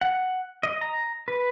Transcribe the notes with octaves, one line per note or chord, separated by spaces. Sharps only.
F#5
D#5
A#5
B4